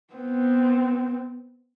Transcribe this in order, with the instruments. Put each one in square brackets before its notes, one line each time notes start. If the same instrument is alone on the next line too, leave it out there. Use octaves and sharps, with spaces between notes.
[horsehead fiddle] B3 C4